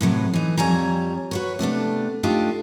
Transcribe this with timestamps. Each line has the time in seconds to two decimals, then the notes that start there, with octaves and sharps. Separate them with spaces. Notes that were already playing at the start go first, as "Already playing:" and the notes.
0.01 A2 C3 F#3 B3
0.34 E3 D#4
0.57 F2 G3 C#5 G#5 A#5
1.31 F#4 B4 C#5
1.59 C3 A3 B3 D4
2.23 A3 D4 D#4 F4 G4 A4